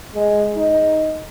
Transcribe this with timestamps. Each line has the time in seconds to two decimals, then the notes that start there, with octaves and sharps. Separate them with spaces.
0.14 G#3
0.56 D#4